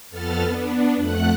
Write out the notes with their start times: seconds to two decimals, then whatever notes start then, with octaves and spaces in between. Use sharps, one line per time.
0.10 F2 B3 A4 F6 A6
0.46 B3 D4
0.96 F2 A3 F#5 F#6